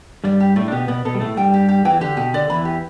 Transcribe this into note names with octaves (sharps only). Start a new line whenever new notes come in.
G2 G3 D5
G4
A2 A3 D5
D4
B2 B3 G4
B2 B3 D5
B2 B3 A4
G3
A2 A3 A4
G2 G3 G5
G4
G4
E2 E3 G5
D3 G4
B2 G4
D3 D5
E2 E3 B5
G4